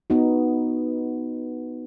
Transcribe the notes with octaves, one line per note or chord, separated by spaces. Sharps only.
B3 D#4 F#4